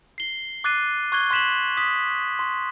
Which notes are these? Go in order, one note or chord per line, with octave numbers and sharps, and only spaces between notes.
C7 G7
D6 F#6 A6 C7 D#7
C#6 F#6 G#6 G7
C6 F#6 B6 E7 F#7
D#6 B6
C6